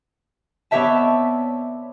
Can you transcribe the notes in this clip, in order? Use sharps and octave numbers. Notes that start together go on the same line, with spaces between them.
B3 C4 C#5 D5 E5 A5